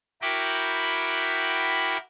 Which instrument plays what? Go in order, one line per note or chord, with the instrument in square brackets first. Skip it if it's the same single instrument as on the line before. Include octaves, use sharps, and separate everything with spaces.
[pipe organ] E4 F#4 A#4 G5 B5 D6